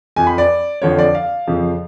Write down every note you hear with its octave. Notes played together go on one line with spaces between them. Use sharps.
F2 F3 G#5
B5
D5
F2 D3 F3 C#5
D5
F5
F2 C#3 F3